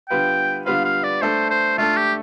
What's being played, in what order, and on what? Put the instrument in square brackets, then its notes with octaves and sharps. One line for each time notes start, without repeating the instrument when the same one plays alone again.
[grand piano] D3 G3 B3 F4 B4 [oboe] G5
[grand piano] D3 G3 B3 F4 B4 [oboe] F5
[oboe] F5
D5
[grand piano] A3 D4 A4 [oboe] C5
[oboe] C5
[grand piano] A3 D4 A4 [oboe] F4
[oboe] G4